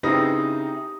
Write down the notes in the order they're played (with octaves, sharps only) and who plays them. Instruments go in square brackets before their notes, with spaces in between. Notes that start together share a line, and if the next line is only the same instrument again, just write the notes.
[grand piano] C#3 D#6 A#6 [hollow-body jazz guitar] C4 E4 B4 [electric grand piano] D#4 [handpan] G4